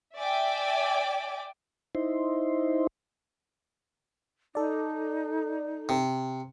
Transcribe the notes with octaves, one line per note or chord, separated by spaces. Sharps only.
D5 E5 G5 G#5 D6
D#4 E4 C5
D#4 A4 D5
C3